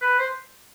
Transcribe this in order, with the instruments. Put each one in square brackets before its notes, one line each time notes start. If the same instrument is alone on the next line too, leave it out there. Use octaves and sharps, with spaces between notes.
[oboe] B4
C5